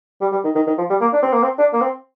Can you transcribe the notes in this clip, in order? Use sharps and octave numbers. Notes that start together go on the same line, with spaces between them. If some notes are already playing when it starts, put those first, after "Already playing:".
G3
G3
D#3
D#3
D#3
F3
G3
A#3
D4
C4
A#3
C4
D4
A#3
C4